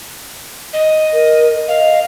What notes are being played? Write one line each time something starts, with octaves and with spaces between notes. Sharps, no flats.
D#5
A#4
D#5 F5